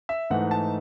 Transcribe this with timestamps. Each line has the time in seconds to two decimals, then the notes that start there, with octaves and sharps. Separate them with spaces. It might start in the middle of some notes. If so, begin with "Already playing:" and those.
0.09 E5
0.30 G#2 E3 A3 D#4 F#5
0.51 A5